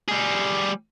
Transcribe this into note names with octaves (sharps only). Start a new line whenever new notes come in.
G3 G#4